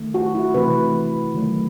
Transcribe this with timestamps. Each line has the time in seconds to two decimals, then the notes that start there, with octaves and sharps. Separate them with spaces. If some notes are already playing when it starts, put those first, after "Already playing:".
Already playing: D#3 A3
0.14 F#4
0.35 E4
0.54 C3 E3 A3 B4
1.34 D#3 F#3 A3